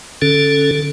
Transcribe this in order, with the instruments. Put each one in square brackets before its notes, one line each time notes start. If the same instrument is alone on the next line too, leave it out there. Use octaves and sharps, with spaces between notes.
[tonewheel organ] D3 C#4 A4